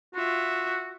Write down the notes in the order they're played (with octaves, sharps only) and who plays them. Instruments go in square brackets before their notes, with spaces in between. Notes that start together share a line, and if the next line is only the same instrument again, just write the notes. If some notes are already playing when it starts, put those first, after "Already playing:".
[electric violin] F4 E5 [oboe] F#4